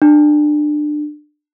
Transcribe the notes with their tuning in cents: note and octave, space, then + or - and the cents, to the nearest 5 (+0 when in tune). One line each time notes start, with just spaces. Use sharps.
D4 +25